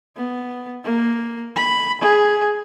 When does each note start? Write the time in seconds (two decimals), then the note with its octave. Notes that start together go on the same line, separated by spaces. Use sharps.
0.17 B3
0.84 A#3
1.56 B5
2.01 G#4